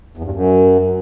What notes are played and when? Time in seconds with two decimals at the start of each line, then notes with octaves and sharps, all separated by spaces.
0.17 E2
0.25 G2
0.32 F#2